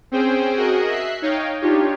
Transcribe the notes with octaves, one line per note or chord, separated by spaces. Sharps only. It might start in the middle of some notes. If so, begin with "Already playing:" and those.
C4 C#4 G#4 C5 G5
F#4 G#4 A#4 D#5
E5 F#6 C7
D#4 C#5 D#5 F5 G5
D4 D#4 F4 G4 C#5